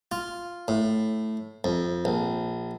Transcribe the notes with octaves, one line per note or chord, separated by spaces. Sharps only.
F4
A2
F2
A#1